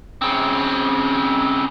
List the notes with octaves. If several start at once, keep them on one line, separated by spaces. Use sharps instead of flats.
C#3 C4